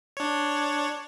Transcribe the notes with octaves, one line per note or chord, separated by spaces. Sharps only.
D4 C#5